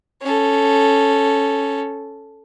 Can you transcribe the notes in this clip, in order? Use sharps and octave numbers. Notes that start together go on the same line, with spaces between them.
C#4 A4